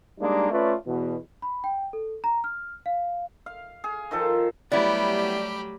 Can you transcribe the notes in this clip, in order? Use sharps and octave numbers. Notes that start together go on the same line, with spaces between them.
G3 G#3 A#3 D4 D#4
A3 C#4 F4 B4 D5
E2 B2
B5
G5
A4
A#5
F6
F5
F5
G#4
D#3 F3 A4
F#3 G3 A3 B3 E4 G4 D5 B5